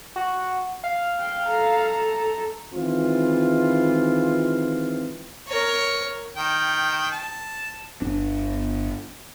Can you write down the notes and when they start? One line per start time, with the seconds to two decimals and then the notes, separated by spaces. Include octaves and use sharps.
0.16 F#4
0.84 F5
1.19 G5
1.47 A4 A#5
2.74 D#3 E3 G#3 C4 F4
5.48 A#4 C#5
6.36 D#3 G5
7.12 A5
8.02 G1 D4